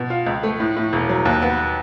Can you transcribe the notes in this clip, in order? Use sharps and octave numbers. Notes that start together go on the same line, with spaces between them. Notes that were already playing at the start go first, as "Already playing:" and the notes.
Already playing: B2
F4
C#2
A3
A2
A2
E1
F#3
D#2
B3